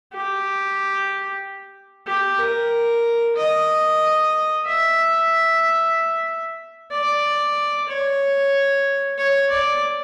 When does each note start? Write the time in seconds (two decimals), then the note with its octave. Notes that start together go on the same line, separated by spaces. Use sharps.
0.13 G4
2.07 G4
2.39 A#4
3.36 D#5
4.65 E5
6.92 D5
7.89 C#5
9.18 C#5
9.50 D5